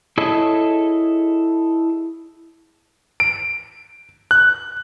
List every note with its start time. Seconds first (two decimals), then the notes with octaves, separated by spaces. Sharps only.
0.18 E4 G#4 A4 C#5 D#5
3.20 D7
4.31 F#6